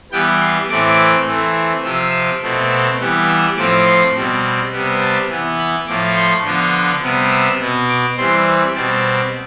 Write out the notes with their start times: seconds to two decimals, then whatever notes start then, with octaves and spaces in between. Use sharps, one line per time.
0.12 E3 G3 B3 G5
0.41 C6
0.69 A2 E3 A3 C4 D6
1.27 E3 A3 C4
1.84 C3 F3 C4 E6
2.42 B2 A3 C4
2.71 E6
3.00 E3 G3 B3
3.29 E6
3.57 A2 F3 C4 D6
3.86 C6
4.15 B2 G3 C4
4.72 C3 G3 B3
5.01 A5
5.30 E3 B3
5.58 B5
5.87 A2 F3 A3 D6
6.16 C6
6.45 D3 F3 B3
7.02 C3 G3 B3
7.31 E6
7.60 B2 B3
7.89 D6
8.17 E3 G3 C4 C6
8.75 B2 G3 C4 A5